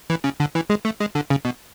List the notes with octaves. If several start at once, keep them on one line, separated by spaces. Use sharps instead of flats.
E3
C#3
D3
E3
G#3
A3
G#3
D3
C#3
B2